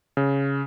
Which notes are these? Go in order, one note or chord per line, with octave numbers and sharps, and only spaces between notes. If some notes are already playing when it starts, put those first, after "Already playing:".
C#3